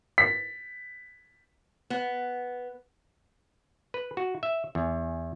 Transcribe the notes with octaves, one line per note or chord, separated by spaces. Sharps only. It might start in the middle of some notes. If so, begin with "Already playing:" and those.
B6
B3
B4
F#4
E5
E2